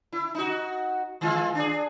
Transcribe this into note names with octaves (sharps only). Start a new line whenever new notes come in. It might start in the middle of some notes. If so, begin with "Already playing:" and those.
E4
D#4 F#4
D#3 G#3 F4
D4 G#4